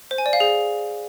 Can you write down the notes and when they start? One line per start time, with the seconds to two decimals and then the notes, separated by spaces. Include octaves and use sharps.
0.11 C5
0.18 G#5
0.26 D5
0.33 F5
0.40 G#4